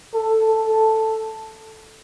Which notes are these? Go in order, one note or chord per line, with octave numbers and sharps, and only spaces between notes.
A4
A4